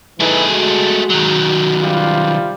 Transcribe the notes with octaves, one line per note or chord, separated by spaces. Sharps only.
E3 A3 D#4 E4 G#4
G#3 F#4
D#3 F#3
C3 G3 F4